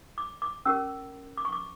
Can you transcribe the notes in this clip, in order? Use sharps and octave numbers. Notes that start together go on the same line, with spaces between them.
D6
D6
C#4 G4 A#4 E6
D6
C#6
D6